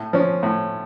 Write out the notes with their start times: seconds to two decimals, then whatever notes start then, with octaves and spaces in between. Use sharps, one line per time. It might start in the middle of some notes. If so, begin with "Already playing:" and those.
Already playing: A2
0.13 F3 C#4
0.43 A2